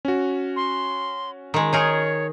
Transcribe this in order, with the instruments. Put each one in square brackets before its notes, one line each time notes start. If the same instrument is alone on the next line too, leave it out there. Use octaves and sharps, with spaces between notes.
[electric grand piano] C#4 F#4
[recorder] C6
[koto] D#3 G#3
[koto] D#4 G#4 A#4 [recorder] C#5